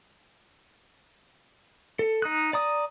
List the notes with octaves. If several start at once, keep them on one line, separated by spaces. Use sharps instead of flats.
A4
D#4 D#6 F#6
D5 A#5 D#6